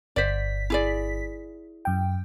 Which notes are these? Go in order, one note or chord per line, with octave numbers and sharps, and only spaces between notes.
G1 C5 D5 B6
E4 G#4 D5
F#2 G5